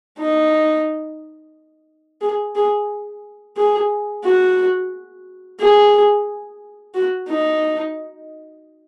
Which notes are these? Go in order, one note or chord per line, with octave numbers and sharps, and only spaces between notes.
D#4
G#4
G#4
G#4
F#4
G#4
F#4
D#4